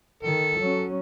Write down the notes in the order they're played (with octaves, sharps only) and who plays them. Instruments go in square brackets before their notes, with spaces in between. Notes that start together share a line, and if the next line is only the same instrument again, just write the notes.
[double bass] D#3 [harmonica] A4
[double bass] F#3 C#4